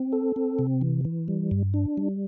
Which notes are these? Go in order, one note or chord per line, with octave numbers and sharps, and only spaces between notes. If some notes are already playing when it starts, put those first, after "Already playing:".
Already playing: C4
A4
C4
C3
E3
E3
G3
G2
D4
G3